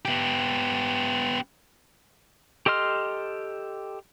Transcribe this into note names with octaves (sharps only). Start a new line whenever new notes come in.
B3 G4
G4 A4 D#5 C6 F6